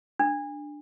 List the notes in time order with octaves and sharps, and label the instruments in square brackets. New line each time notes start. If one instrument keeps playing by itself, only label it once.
[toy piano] D4